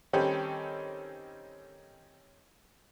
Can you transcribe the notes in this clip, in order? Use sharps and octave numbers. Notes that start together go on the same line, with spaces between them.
D#3 G3 C4 C#4 G4 A4